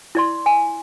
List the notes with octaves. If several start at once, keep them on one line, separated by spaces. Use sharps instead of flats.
E4 D5 C6
G#5